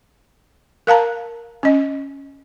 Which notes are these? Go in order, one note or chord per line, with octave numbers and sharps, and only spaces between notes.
A#4 F5 A5 A#5
C#4 D#5